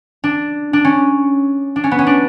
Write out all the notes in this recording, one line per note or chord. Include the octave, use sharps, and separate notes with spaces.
D4
D4
C#4
D4
C#4
B3
C#4
D4